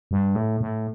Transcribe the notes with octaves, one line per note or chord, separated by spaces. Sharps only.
G2
A2
A2